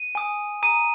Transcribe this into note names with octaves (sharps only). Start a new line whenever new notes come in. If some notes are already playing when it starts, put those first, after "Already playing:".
Already playing: D#7
G#5 D#6
A#5 D#6 D#7